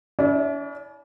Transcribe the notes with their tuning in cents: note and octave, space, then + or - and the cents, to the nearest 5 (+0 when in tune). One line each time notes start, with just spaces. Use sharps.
C#4 +45 E4 -25 D5 +5